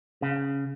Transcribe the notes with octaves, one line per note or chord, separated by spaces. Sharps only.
C#3